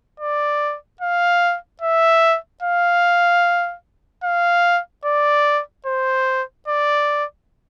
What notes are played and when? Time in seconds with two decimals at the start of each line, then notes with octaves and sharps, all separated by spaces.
0.20 D5
1.01 F5
1.81 E5
2.63 F5
4.24 F5
5.05 D5
5.86 C5
6.68 D5